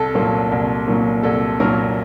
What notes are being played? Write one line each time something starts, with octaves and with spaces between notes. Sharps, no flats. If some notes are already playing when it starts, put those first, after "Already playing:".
Already playing: C2 A4
A#2 F#3 A#3
C2
A#2 F#3 A#3
C2 A4
A#2 F#3 A#3 A#4